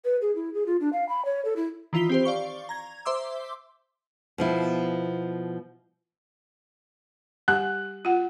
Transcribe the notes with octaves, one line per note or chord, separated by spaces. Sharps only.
B4
G#4
E4
G#4
F4
D4
F5
B5
C#5
A4
E4
D#3 E3 F4 B6 G7
C4 G4 C5
D5 F5 C#6 G7
A#5 G#6
C5 E5 C6 D6 E6
B2 F3 E4
G3 G4 G#5 F#6
F4 F#5